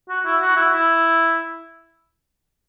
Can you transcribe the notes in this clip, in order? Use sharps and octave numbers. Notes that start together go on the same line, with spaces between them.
F#4
E4
F#4
E4
E4